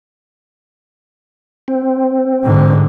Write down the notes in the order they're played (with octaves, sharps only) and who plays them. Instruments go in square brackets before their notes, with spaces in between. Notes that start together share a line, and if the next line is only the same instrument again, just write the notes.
[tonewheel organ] C4
[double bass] G#2 D3